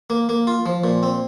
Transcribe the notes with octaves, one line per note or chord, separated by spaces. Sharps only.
A#3
A#3
F4
F3
A#2
C4